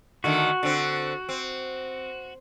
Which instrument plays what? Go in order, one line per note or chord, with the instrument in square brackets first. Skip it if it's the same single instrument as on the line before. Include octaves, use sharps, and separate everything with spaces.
[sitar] D3 D#3 A3 [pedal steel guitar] F#4
[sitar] D3 C4
C4